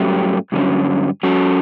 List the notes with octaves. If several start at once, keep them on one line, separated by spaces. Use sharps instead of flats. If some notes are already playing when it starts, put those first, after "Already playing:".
Already playing: G2 F#3 A3 C#4 G4
G2 D3 F#3 C#4
F#3 C#4 F#4 A4